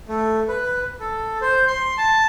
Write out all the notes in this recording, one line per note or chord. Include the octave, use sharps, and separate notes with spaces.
A3
B4
A4
C5
C6
A5